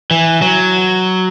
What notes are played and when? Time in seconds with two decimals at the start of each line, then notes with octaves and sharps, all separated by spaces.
0.11 E3
0.42 F#3